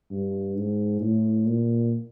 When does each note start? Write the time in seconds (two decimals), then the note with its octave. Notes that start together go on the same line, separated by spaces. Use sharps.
0.10 G2
0.56 G#2
1.01 A2
1.46 A#2